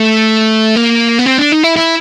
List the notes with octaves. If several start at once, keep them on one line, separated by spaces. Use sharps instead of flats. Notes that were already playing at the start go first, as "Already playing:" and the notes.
Already playing: A3
A#3
B3
C4
D4
D#4
E4
E4